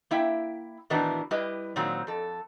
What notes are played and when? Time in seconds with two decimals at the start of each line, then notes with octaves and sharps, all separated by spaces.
0.11 A#3 E4 E5 G5
0.90 A2 D#3 E3 B3 D4 F#4
1.31 G3 E4 G4 B4 D#5
1.76 A#2 D#3 F#3 C4
2.07 F2 A4